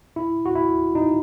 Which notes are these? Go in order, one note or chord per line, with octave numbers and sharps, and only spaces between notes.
E4
F#4
E4
D#4